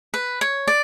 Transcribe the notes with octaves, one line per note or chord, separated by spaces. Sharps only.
B4
C#5
D5